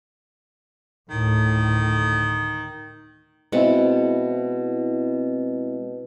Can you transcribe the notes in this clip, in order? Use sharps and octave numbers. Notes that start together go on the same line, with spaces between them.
D2 A2 D#3
B2 G#3 C4 E4 F#5 A5